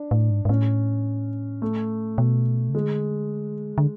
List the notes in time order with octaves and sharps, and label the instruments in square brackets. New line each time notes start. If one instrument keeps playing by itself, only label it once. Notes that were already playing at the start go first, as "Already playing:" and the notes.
Already playing: [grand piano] D4
[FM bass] A2
G#2
G#2
[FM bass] A2 [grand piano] C#4
[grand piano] A3
[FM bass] B2
C#3
[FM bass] D3 [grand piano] G#3
[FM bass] D3